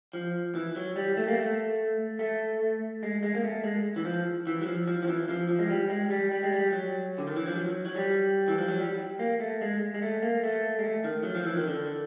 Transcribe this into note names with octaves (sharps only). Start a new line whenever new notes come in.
F3
E3
F#3
G3
A3
A#3
A3
A3
G#3
G#3
A#3
A3
G#3
E3
F3
E3
F#3
F3
F3
F3
E3
F3
F3
G#3
G3
G#3
G3
G3
G#3
G3
F#3
D3
D#3
E3
F3
F#3
F#3
G3
E3
F3
F#3
G3
A#3
A3
G#3
G#3
A3
A#3
A3
G#3
A3
D#3
F#3
F3
E3
D#3
D3